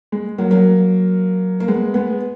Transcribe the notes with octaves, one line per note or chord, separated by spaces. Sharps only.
G#3
F#3 A#3
F#3 A#3
A#3
G#3 B3
G#3 B3